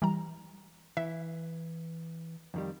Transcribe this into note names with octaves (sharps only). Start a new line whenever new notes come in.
E3 G3 A#5
E3 E5
F2 D#3 G3